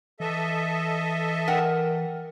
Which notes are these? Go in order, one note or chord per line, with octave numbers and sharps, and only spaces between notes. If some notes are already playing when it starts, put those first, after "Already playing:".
E3 A4 D#5 E5
A#4 F#5 G5